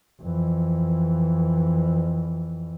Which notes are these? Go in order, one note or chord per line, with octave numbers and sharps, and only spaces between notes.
F2 E3